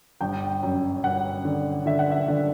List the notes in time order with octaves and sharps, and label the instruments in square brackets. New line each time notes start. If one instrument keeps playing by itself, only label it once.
[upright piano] G1 G5
F#2
G1 F#5
D3
D3 E5
F#5
E5
D3